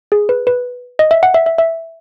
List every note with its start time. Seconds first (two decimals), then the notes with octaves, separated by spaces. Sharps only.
0.12 G#4
0.29 B4
0.47 B4
0.99 D#5
1.11 E5
1.23 F#5
1.34 E5
1.46 E5
1.58 E5